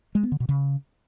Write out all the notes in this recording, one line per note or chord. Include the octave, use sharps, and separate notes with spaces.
G#3
B3
D3
B2
C#3